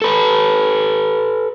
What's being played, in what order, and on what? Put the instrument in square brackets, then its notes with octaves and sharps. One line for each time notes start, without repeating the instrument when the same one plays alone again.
[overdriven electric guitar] A4 B4